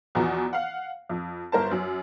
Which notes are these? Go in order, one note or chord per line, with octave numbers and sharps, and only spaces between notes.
E2 B2 F3 A#5
F5 F#5
F2
G1 A#4 C5 A5
F#2